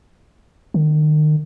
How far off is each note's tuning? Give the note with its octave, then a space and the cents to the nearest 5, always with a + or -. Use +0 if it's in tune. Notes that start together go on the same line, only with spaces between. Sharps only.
D#3 -35